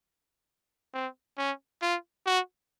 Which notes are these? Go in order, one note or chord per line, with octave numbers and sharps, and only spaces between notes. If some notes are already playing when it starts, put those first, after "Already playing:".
C4
C#4
F4
F#4